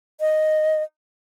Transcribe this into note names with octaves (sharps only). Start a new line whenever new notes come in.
D#5